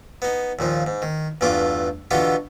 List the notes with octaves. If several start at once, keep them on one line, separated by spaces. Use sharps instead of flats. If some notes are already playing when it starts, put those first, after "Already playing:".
B3 D#4
D#2 A#2 F3
G#2
D#3
E2 G2 E3 A3 F4 D6
B2 D3 E3 B3 F4 G4